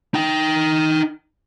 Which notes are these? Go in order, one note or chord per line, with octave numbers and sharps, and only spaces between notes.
D#4 G5